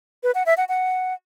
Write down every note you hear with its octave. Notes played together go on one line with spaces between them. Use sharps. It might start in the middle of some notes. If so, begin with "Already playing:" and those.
B4
F#5
E5
F#5
F#5